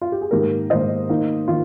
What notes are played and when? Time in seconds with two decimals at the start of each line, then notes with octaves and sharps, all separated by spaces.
0.01 F4
0.12 G4
0.21 G#4
0.31 G#2 D#3 A#3 D#4 G4 A#4
0.70 G#2 D#3 A#3 D#4 C5 D#5
1.09 D#3 A#3 D#4
1.48 D#3 F4